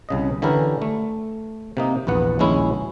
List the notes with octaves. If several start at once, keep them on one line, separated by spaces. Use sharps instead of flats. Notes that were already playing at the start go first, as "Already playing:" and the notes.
C2 C#3 D#5
D3 E3 C#4 E4 G4 A#4
A3
C3 A#3 D#4
A#1 E2 B3 F#5
A#1 D#2 G#3 C#4 E4